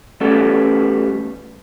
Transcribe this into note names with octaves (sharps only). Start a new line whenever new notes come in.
E3 G3 A3 B3 C#4 A4